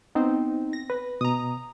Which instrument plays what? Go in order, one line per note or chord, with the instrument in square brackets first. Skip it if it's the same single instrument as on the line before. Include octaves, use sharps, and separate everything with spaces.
[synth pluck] B3 C4 [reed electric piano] D#4
[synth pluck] A#6
[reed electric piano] B4
[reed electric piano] B2 [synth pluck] A#5 D#6